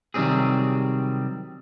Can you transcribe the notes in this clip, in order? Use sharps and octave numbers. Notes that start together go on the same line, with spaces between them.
C3 D#3 F#3 G3 C4 G#4